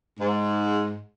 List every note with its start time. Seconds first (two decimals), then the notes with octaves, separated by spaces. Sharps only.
0.19 G#2